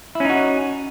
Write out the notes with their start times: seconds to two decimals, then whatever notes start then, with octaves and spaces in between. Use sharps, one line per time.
0.15 E4
0.20 C#4
0.25 D#4
0.30 F#4